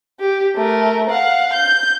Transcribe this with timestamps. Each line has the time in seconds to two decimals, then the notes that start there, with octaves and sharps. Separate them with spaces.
0.20 G4
0.55 A3 A#4
1.10 F5 F#5
1.53 G6